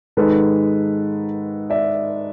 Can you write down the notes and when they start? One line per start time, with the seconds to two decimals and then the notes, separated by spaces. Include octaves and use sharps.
0.17 G#2 D#3 G#3 A4 B4
1.70 D5 E5